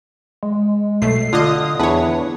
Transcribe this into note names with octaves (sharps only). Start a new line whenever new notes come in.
G#3
B1 B2 A3 C7
D3 F4 D#5 D#6
E2 D4 B4 C#5